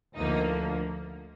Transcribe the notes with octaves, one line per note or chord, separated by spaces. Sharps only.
D2 D3 F3 A#3 D#4